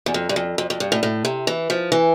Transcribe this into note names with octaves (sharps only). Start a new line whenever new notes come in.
E2
F2
G2
F2
F2
F2
G2
A2
A2
C3
E3
F3
E3